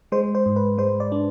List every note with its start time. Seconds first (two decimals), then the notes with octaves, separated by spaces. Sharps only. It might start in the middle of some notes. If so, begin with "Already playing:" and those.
0.12 G#3 C5
0.35 C5
0.46 G#2
0.56 B4
0.78 G#3 C5
1.00 D5
1.12 D4